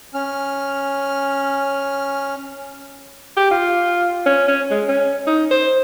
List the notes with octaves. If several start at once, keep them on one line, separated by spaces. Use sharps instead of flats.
C#4 F6
G4
F4
C#4
C#4
G#3
C#4
D#4
C5